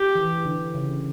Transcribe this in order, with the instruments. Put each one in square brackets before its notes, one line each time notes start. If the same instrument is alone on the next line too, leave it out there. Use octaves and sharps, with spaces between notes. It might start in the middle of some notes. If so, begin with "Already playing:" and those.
Already playing: [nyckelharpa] G4
[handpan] E3
D3
C#3